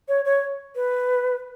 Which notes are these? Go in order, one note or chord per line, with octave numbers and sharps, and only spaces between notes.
C#5
C#5
B4